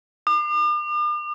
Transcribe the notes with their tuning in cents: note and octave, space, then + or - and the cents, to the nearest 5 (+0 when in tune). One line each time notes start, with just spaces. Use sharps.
D6 +45